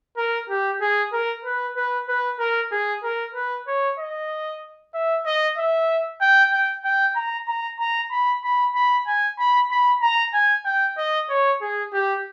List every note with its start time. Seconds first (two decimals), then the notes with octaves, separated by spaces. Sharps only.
0.17 A#4
0.49 G4
0.81 G#4
1.13 A#4
1.45 B4
1.77 B4
2.08 B4
2.39 A#4
2.72 G#4
3.04 A#4
3.35 B4
3.67 C#5
3.99 D#5
4.94 E5
5.26 D#5
5.58 E5
6.21 G5
6.52 G5
6.85 G5
7.16 A#5
7.48 A#5
7.80 A#5
8.12 B5
8.44 B5
8.75 B5
9.07 G#5
9.39 B5
9.71 B5
10.02 A#5
10.33 G#5
10.66 G5
10.98 D#5
11.29 C#5
11.61 G#4
11.93 G4